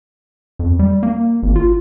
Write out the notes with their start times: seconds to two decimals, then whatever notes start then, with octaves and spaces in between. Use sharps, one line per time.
0.59 F2
0.79 G3
1.03 A#3
1.43 G#1
1.56 F4